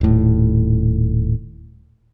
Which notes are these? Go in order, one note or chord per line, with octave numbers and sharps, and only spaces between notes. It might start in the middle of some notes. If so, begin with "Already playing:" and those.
D#1 A2